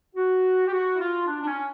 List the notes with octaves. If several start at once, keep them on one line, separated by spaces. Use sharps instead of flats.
F#4
G4
F#4
E4
F4
D4
D4
C#4